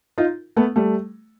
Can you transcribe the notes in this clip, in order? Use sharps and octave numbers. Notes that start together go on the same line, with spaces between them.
D#4 F4
A3 B3
G3 A3